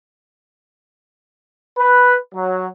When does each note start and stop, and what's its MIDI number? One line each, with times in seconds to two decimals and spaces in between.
1.78 2.17 71
2.34 2.67 54